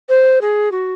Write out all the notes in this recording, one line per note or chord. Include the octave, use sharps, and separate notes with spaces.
C5
G#4
F#4